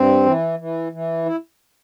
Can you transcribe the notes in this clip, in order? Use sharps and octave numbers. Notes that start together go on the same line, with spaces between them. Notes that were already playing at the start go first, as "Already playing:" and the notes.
Already playing: G2 C4
E3
E3
E3
E4